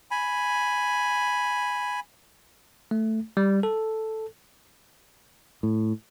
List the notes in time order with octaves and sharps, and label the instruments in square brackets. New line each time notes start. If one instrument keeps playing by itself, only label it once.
[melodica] G#5 B5
[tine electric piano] A3
G3
A4
[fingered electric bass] A2